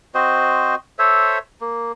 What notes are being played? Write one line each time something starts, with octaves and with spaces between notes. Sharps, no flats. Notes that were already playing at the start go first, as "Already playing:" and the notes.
C4 F#4 C5 D#5
A4 C5 C#5 E5
A#3